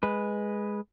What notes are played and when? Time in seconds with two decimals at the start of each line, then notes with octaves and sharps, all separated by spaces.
0.03 G#3 B4